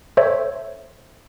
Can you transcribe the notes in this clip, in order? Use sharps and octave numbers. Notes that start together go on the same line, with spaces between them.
A4 C5 C#5 E5